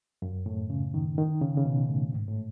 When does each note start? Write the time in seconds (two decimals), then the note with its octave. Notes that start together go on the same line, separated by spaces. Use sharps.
0.22 F#2
0.46 A2
0.70 C#3
0.94 D#3
1.18 D#3
1.42 C#3
1.57 C#3
1.65 B2
1.89 A2
2.12 G#2
2.28 A2